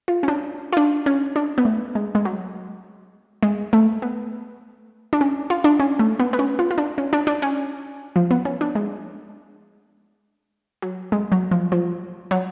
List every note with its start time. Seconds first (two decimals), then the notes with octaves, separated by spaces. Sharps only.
0.08 F4
0.23 C#4
0.28 D4
0.73 F4
0.77 D4
1.06 C#4
1.36 D4
1.58 B3
1.65 A3
1.95 G#3
2.15 G#3
2.25 F#3
3.43 G#3
3.73 A3
4.02 B3
5.13 D4
5.21 C#4
5.50 F4
5.64 D4
5.80 C#4
5.99 A3
6.20 B3
6.33 B3
6.39 C#4
6.59 F4
6.71 F4
6.78 D4
6.98 C#4
7.13 D4
7.27 D4
7.42 C#4
8.16 F3
8.31 B3
8.45 C#4
8.61 D4
8.75 G#3
10.82 F#3
11.12 G#3
11.32 F#3
11.51 F3
11.72 F3
12.31 F#3